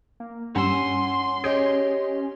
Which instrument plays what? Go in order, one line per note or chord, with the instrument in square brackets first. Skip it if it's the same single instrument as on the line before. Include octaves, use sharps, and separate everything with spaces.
[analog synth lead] A#3
[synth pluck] G2 G3 E6 [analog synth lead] C#4 [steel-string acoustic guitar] F#5 G#5 [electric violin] C6
[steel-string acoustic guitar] G4 C#5 D#5 [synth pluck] G#4 G5